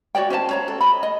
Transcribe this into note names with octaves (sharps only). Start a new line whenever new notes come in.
F#4 C#5 D5 G5
C#4 C5 C#5 A5
C#5 A#5
A4
D#5 B5
D#5